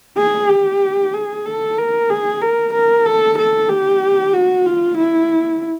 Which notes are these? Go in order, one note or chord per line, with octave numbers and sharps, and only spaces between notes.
G#4
G4
G#4
A4
A#4
G#4
A#4
A#4
A4
A4
G4
F#4
F4
E4